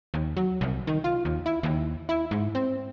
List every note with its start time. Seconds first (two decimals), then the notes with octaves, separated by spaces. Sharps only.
0.14 D#2
0.37 F#3
0.61 C2
0.87 D#3
1.04 F4
1.25 D#2
1.46 E4
1.63 D#2
2.09 E4
2.31 G#2
2.55 C4